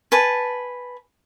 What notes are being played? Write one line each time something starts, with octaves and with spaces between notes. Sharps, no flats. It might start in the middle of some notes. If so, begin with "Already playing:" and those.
B4 G#5 A5